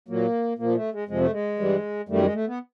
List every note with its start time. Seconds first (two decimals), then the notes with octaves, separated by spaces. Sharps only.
0.08 A#2 F#3 A#3
0.59 A#2 F3 A#3
0.75 A3
0.92 G#3
1.08 F2 C3 F3 G#3
1.20 A3
1.31 G#3
1.59 G2 E3 G3
2.09 F#2 D#3 G3 A3
2.22 G#3
2.34 A3
2.47 B3